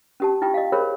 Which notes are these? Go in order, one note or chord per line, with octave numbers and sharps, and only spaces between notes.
C#4 G4 A5
E4 F4 G5 C#6
D#5 F5
G#4 A#4 C5 C#5 B5